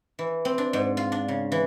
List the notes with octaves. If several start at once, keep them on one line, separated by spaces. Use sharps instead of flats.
E3
C4
D4
G#2
F4
D4
C#3
E3